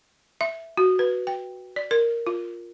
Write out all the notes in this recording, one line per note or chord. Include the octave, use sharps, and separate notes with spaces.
E5
F#4
B4
G5
D5
A#4
F4